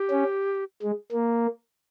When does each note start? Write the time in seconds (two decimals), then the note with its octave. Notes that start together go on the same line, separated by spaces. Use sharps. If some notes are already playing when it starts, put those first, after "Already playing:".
Already playing: G4
0.11 C#4
0.82 G#3
1.12 A#3